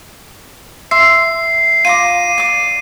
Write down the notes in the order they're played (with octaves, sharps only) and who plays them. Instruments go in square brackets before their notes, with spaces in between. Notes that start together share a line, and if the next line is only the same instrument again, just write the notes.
[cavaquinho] E5 C6 [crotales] C7
[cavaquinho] F4 A#5 D6 [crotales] D#7
[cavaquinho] D5 D6